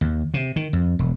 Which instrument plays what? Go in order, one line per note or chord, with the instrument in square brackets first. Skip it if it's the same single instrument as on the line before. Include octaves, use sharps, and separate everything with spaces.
[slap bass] D#2
C3
D#3
F2
E1